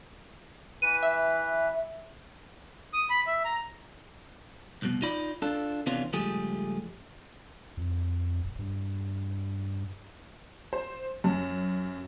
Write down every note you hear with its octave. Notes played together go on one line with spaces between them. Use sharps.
E3 B4 D#7
E5
D#6
B5
E5
A#5
C2 F2 B2
D#4 F4 D5 B5
D4 F4 A4
C3 E3 B3 C#4 D4 F4
C#2 G2 F3 A3 G4 G#4
F2
D#1
G2
C5
F#2